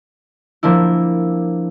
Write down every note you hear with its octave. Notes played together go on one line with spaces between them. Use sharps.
F3 A#3 D4 E4